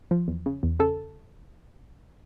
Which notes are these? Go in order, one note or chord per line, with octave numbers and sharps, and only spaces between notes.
F3
E2
C#3
E2
C#3 A4